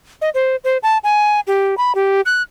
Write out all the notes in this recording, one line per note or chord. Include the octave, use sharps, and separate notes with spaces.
D#5
C5
C5
A5
G#5
G4
B5
G4
F#6